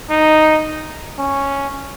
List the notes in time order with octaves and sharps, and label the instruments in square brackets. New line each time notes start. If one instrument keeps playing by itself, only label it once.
[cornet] D#4
C#4